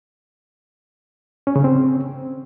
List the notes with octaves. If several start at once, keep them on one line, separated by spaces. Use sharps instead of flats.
C#4
C#3
C4